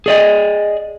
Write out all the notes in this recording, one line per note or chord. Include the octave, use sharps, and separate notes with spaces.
G#4 D5 D#5